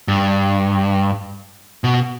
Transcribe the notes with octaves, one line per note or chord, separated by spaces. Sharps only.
G2
B2